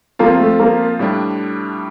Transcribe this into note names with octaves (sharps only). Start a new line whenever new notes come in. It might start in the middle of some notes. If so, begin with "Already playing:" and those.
F3 A#3 C4 F4
A3
A#3
A2 G3 D4